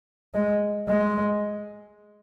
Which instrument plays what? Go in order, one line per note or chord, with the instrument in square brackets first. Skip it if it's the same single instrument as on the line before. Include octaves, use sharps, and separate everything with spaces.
[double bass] G#3
G#3